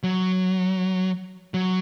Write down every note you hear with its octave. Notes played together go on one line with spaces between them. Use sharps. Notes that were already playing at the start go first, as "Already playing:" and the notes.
F#3
F#3